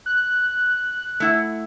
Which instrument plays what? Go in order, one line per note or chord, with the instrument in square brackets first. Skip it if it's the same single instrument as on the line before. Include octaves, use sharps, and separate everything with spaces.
[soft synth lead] F#6
[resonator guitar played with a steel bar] A3 E4 F#5